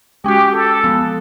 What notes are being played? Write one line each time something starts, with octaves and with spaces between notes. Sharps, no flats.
G#3 C#4 F#4 G4
A4
F3 G#3 B3